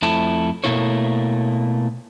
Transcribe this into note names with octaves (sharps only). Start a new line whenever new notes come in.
F2 F3 A3 E4 A5
B2 A3 A#3 E4 C#5